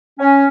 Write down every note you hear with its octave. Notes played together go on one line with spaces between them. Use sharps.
C#4